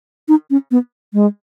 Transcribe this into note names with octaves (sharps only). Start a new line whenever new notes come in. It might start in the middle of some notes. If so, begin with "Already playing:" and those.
D#4
C#4
B3
G#3